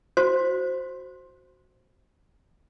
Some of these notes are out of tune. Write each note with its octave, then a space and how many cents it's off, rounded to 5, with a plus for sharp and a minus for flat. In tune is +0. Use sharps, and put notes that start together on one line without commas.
F#4 +0 C5 +0 C6 +15